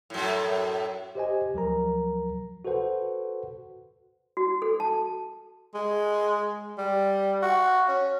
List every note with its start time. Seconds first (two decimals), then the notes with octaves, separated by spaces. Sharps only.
0.10 F#2 A2
1.15 G4 C5 D#5 G#5
1.54 D2 F3 F#3 A#4 A#5
2.65 F#4 A4 B4 C5 F#5
4.37 F#4
4.62 A4
4.80 A5
5.74 G#3
6.78 G3
7.42 F#4
7.88 C#4